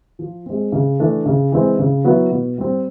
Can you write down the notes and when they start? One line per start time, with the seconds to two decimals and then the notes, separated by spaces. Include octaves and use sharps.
0.19 F3
0.46 G#3 C4
0.72 C#3
0.99 E3 A3 D4
1.26 C#3
1.52 E3 G#3 C4
1.79 C#3
2.04 F#3 B3 E4
2.31 B2
2.58 G3 C4